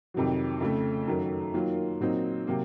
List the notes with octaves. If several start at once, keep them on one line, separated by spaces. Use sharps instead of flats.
F2 C3 D#3 F#3
F2 C#3 A3
F#2 D#3 F#3 A3
D#3 F#3 A#3 F4
A#2 F#3 C4 D#4
C3 F#3 A#3